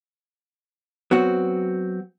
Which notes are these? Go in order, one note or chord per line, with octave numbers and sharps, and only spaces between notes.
F#3 B3 C4 F#4